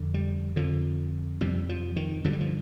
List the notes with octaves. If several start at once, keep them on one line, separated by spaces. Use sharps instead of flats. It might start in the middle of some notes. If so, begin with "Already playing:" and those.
Already playing: F2 D3
G3
F2 D3 F3
F2 C3 G3
F3
D#3
G2 D3 F3
G3
F3